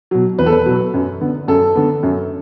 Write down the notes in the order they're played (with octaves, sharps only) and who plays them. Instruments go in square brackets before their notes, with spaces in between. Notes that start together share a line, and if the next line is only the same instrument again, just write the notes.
[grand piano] B2 F#3
E2 B4
A4
B4
B2 F#3
F#2
D3 B3
F#2 A4
D3 B3
F#2